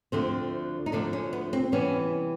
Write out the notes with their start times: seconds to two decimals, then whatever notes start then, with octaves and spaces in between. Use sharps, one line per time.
0.12 D2 D3 F3 A3 C4
0.86 D#4
0.92 D2 D3 F3 A3 D4
1.13 C#4
1.33 B3
1.53 C4
1.72 C3 E3 G3 B3 C#4